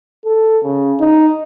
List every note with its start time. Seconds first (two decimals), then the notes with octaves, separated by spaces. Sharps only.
0.24 A4
0.63 C#3
1.00 D#4